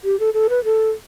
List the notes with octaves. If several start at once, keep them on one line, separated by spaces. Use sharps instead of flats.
G4
A4
A4
B4
A4